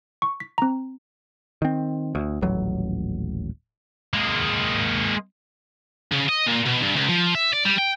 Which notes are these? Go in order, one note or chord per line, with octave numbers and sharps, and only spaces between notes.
C#6
B6
C4 A#5
D#3 C4
D2
D#1 A1 F#3
G#3 A#3
C#3
D#5
A#2
B2
G2
C#2
F3
E5
D5
G3
G5